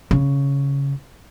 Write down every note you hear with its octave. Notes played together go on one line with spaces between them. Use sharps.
C#3